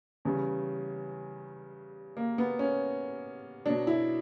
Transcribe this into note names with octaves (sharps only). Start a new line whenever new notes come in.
E2 C#3 G3 C#4
A#3
B3
C#4
B2 F#3 D4
E4